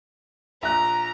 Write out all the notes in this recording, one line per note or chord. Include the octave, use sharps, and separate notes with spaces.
A#1 A#5 F#6